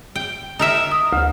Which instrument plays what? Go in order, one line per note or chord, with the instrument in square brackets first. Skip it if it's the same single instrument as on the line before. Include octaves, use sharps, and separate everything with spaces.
[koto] G5
D#4 A#4 E5
[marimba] D#6
D2